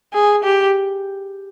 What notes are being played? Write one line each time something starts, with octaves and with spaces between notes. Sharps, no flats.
G#4
G4